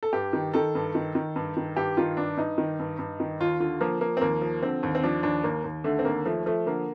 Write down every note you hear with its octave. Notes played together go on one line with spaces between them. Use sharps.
A4
G2 G4
D#3
D#3 A4
G2
D#3
D#3
G2
D#3
G2 G4
D#3 F4
G2 D4
G2 D#4
D#3
G2
G2
D#3
D#2 F4
D3 F4
F3 A#3
F3 A#3
C4
D#2 A#3
F3
D3 C4
D#2
C4
F3 D4
D#2 D4
D#2 A#3
D#2
D3 A3
C4
D#2 A#3
F3 A3
F3 A3
D3 A#3